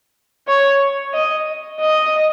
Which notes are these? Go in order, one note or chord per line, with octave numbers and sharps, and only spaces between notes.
C#5
D#5
D#5